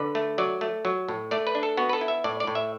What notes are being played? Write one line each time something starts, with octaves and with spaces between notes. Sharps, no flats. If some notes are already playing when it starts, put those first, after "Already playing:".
Already playing: D3 B4
A3
F#3 D5
A3
F#3
A2
A3 D5
B4
D4
A4
B3 F#4
B4
A4
E4
E5
A2 D5
D5
A2
E5